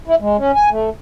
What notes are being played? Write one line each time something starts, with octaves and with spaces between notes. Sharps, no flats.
E4
G#3
C#4
G#5
A3